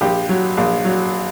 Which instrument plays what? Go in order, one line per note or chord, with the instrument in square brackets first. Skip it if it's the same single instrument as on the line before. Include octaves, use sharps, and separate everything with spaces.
[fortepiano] A#1 G4
F#3
A#1
F#3